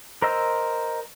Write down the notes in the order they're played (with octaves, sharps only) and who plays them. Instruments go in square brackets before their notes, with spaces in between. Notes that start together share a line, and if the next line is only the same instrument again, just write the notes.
[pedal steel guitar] A#4 C5 D#5 E6